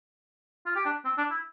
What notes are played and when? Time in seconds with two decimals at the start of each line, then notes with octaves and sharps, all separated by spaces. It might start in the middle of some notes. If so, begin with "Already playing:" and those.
0.66 F4
0.76 G4
0.86 D4
1.05 C4
1.17 D4
1.31 E4